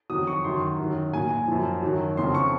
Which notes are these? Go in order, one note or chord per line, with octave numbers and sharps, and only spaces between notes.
F2 D#3 F#3 D#6
C#6
F#2 D#3 F#3 C6
F#2 D#3 F#3
A#2 F#3 G#5
G#5
F#2 F3
F#2 D#3 F#3
F2 C#3 F3 C6
C#6